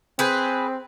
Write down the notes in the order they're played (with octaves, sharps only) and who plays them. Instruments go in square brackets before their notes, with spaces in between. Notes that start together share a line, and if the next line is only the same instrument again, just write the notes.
[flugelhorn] C4 [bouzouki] G#4 B4 C5